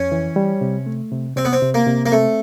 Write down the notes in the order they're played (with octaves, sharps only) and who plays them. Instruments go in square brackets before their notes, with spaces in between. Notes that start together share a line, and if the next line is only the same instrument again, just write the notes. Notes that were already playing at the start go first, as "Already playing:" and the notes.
Already playing: [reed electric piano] F2 [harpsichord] C#4
[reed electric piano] E3
G3
C3
A3
C3
[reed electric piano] C3 [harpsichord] C4
[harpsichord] B3
C4
[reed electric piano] C3
[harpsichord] A#3
[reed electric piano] C3
[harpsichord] A#3
[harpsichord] A3 [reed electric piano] C4